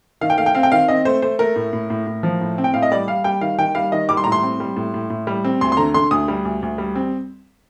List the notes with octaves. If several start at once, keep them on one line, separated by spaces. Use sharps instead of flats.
D#3 F5
G5
A3 F5
G5
C4 F5
G5
D#3 F5
C4 D#5
A3 C5
A3 C5
A3 A#4
A2
A2
A2
A2
F3
A2
C4
G5
A2 F5
D#5
G3 D5
G3 F5
G3 G5
D#3 F5
D#3 G5
G3 F5
D#3 D#5
G3 D6
C6
A2 A#5
C6
C4
G3
A2
A2
A2
G3
C4
D2 C6
C6
D3 A#5
D3 C6
D2 D#6
G3
D2
D2
G3
C4